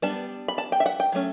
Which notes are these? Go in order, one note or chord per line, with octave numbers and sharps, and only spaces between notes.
G3 B3 D4 A5
B5
A5
G5
E5
F#5
G5
F#3 A3 C#4